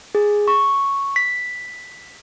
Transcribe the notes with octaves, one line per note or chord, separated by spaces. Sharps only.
G#4
C#6
B6